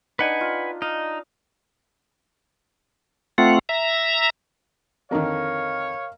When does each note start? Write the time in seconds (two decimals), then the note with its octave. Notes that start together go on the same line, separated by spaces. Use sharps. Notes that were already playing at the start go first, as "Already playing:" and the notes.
0.19 D4 D#4 B4 F#5 G#5
0.41 F4
0.82 D#4 F5
3.38 A3 C4 F4 F#5
3.69 E5 A#5
5.11 F2 D3 D#3 A#4 C#5 D#5 F5 A#5